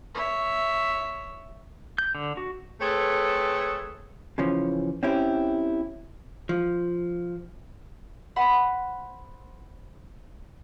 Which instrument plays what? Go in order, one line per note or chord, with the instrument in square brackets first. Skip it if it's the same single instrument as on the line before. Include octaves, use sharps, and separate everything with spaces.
[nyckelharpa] C#5 E5
[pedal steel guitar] G6
D3
F#4
[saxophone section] A3 C4 G#4 A4 B4 C#5
[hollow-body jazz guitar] C#3 E3 F3 C#4
C4 C#4 E4 G4
F3
[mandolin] C5 F#5 B5 C6